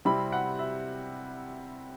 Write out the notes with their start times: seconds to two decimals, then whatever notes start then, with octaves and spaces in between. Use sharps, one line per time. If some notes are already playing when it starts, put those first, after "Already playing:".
0.05 C3 G3 C4 E4 B5
0.32 F#5
0.59 E5